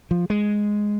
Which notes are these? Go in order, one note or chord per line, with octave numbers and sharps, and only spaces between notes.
F3
G#3